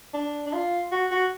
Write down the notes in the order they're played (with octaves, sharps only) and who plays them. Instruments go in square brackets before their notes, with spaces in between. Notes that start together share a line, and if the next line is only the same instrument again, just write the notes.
[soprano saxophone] D4
D4
F4
F#4
F#4